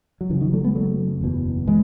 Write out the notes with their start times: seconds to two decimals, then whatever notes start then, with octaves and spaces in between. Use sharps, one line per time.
0.21 F#3
0.29 F#1 F#2 C#3 E3
0.41 D#3 F#3
0.53 F#3 A3
0.64 G#3 B3
0.75 F#3 A3
1.21 F#1 E2 B2
1.67 E3 G#3